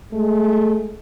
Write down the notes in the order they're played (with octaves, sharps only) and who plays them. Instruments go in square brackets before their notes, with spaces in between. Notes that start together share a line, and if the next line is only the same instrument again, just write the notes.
[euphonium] G#3 [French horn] A3